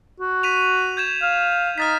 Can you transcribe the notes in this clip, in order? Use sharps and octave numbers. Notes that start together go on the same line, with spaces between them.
F#4
B6 D#7 F7
G6 G#6 E7
F5
D#4 F6 A6 B6